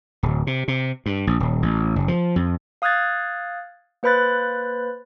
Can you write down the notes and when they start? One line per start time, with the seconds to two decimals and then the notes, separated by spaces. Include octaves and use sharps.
0.23 D1
0.47 C3
0.68 C3
1.06 G2
1.27 A#1
1.40 D#1
1.62 A1
1.96 F#1
2.08 F3
2.36 F2
2.82 F5 D#6 F6 F#6 G#6 A6
4.03 A#3 B4 C5 B5 F#6 A6